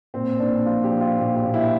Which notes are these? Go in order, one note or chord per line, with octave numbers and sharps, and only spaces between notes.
A#2 C4
A#2 D4
F3 F4
G4
F3
F4
A#2 G4
F4
A#2
E4